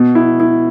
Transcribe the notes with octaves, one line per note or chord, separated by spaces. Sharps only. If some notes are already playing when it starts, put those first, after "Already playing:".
Already playing: B2
E4
E4